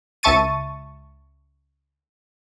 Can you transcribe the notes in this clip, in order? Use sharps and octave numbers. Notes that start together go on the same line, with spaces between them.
C#2 E5 A5 C#6 A6 D#7